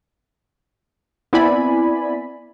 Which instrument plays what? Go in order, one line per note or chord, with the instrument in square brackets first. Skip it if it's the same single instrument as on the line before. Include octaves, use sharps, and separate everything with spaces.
[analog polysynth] B3 C4 E4 D5 G#5 B5